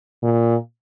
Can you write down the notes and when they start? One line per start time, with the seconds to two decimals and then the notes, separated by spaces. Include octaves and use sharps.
0.23 A#2